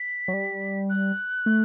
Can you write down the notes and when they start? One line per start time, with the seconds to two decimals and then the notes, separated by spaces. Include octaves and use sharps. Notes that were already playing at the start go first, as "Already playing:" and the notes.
Already playing: B6
0.28 F#3
0.34 G3
0.90 F#6
1.46 A3